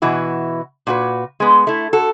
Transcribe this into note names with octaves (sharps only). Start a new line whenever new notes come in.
B2 E3 E4 F#4
A#2 F#4 B4
G#3 B3
A3 E4
F#4 A4